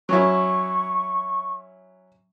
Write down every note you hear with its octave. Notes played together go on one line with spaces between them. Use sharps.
F#3 C#4 E4 C#6